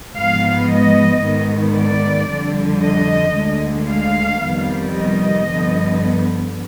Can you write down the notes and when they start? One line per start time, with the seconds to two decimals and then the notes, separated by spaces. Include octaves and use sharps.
0.17 G#2 F3 G#3 B3 F5
0.70 D#5
1.24 G#2 D#3 B3
1.76 D5
2.31 F2 D3 G3
2.83 D#5
3.37 D2 D3 G#3
3.90 F5
4.44 F2 C3 D#3 G3 B3
4.97 D#5
5.51 G2 D3 F3 B3